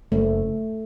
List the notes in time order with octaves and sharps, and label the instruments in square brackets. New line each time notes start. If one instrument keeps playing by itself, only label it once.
[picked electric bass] F#1 [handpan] A3